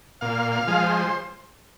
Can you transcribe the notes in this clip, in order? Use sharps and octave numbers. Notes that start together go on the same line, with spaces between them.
A#2 F5
F5
F3 G#3
C5